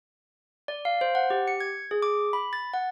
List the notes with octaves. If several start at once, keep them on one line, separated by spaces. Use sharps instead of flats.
D5
F5
C5
F#5
G4
C#7
G#6
G#4
D6
B5
A6
F#5